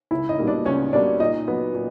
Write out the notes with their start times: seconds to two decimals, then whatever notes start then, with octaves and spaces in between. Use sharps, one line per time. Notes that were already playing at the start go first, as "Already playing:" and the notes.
0.11 C#2 E4 E5
0.29 D#4 D#5
0.38 B2 G3 A#3
0.47 D4 D5
0.65 C#2 C#4 C#5
0.93 B2 G3 A#3 D4 D5
1.20 A#2 D#4 D#5
1.47 F#3 B3
1.75 A#2